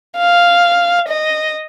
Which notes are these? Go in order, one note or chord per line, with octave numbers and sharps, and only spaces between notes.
F5
D#5